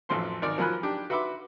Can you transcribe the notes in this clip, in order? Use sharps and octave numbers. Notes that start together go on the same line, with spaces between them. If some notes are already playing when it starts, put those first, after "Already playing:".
A1 F2 F#3 A4 C5 C6
G#1 D#3 A#4 D5
F3 F#3 A#4 G#5 B5 F#6
D4 G4
F#4 B4 E5 B5 C6 D6